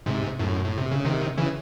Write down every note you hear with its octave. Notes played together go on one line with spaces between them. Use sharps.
G#2 C3
F#2 A2
A2
C3
C#3
C3 D#3
C#3 E3